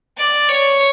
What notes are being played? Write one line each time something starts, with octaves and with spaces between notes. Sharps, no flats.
D5
C#5